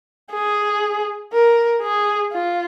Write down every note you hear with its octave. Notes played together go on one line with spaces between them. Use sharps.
G#4
A#4
G#4
F4